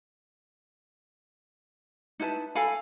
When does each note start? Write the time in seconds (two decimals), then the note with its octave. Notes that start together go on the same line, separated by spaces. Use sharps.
2.20 D#4 E4 B4 A5
2.55 A4 F5 G#5 B5